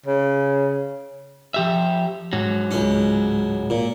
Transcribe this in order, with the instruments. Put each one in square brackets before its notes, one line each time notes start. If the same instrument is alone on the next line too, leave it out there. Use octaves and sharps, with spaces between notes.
[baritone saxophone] C#3
[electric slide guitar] F3 G4 E5
G#2 F#3
[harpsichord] C#2 C#4
A#2